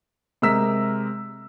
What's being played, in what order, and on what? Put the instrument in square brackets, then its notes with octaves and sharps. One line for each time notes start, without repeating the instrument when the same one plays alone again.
[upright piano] C3 G#3 A#4 E6 B6